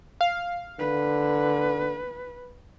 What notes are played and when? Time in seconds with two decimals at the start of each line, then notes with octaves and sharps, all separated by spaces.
0.21 F5
0.80 D3 B4